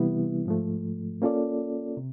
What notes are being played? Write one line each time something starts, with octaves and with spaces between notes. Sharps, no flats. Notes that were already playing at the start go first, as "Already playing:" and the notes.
Already playing: C3 E3 G3 B3 E4
G#2 F3 A3
A#3 C#4 F4 A4 D5
C3